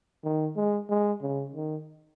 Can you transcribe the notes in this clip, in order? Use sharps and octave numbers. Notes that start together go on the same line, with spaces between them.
D#3
G#3
G#3
C#3
D#3